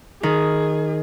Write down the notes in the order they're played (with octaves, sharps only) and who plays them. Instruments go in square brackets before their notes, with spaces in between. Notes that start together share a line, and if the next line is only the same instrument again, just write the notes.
[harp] D#3 [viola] G#4